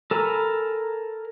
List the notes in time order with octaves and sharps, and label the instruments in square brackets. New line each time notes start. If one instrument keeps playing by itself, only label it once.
[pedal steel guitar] A4 A#4 G#5 A#5 B5